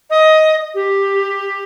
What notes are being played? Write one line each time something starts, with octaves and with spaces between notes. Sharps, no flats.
D#5
G4